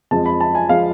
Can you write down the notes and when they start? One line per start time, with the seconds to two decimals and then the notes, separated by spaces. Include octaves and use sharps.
0.11 F2 F3 G#3 A5
0.26 B5
0.41 A5
0.55 G#5
0.69 F3 G#3 F5